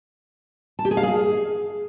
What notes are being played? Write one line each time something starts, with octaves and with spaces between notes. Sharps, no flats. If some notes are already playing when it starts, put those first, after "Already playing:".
A5
G4
G#4
F5
G#4